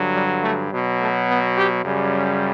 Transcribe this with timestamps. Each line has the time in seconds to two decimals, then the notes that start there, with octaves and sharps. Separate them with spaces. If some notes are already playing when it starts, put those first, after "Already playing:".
Already playing: G2 D3 F#3
0.14 G3
0.42 A3
0.70 B2 F#3
0.99 A3
1.27 B3
1.56 G4
1.84 F#2 C#3 G3